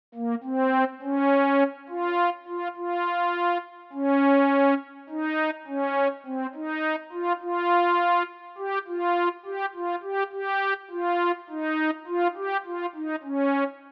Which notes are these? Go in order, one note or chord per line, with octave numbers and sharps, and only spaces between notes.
A#3
C4
C#4
F4
F4
F4
C#4
D#4
C#4
C4
D#4
F4
F4
G4
F4
G4
F4
G4
G4
F4
D#4
F4
G4
F4
D#4
C#4